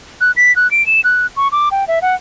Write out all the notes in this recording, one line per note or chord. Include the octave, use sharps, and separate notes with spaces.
F#6
B6
F#6
D7
E7
F#6
C#6
D6
G5
E5
F#5